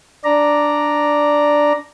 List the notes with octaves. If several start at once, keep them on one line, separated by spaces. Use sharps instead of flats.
D4 D5 A#5